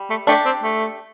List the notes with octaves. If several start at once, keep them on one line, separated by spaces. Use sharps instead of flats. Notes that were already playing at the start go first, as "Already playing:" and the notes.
Already playing: G3
A3
A3 D4 G4 D5
C4
A3